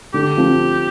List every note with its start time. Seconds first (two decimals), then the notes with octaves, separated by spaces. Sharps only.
0.14 D3 G4
0.37 F3 C4